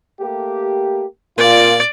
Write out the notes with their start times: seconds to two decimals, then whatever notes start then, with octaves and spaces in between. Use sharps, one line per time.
0.20 A3 A#3 G4
1.38 A#2 F4 D5